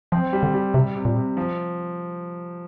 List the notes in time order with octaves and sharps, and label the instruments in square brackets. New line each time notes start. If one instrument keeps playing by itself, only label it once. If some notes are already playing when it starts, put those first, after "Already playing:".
[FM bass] F3 [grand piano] C4
[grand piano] G3
[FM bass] D3
[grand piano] G3
[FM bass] C3 [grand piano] G3
[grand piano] C3
[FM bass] A#2
[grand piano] C3
F3